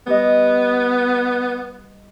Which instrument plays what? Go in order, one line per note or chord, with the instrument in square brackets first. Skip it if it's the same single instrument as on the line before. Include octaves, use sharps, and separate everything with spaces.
[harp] G3 D#5 [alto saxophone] B3